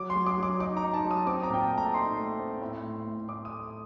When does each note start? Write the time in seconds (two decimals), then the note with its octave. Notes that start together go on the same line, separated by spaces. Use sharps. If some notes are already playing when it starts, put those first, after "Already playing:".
Already playing: F#3 D6
0.10 C6
0.16 F#3
0.26 D6
0.38 F#3 D6
0.60 D#4 D6
0.77 A#5
0.82 D#4
0.94 A5
1.05 F#3
1.11 D#6
1.27 C4 D6
1.43 A#5
1.50 A#2 G5
1.61 A5
1.71 A3
1.78 A#5
1.94 D#4 C6
2.17 A3
2.39 C4
2.61 A2
2.83 A2
3.06 A2
3.28 A2 D6
3.45 D#6
3.51 A3